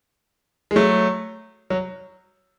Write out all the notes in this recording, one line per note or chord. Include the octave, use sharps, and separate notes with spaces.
G#3
F#3 A3
F#3